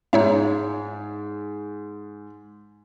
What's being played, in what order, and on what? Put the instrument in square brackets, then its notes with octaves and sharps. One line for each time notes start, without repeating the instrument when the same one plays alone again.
[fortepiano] G#2 [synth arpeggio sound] D#4 C#5 E5